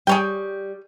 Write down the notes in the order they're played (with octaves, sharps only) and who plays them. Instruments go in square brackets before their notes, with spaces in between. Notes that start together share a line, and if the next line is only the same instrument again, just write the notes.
[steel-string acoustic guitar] G3 [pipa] G#4 C#5 G5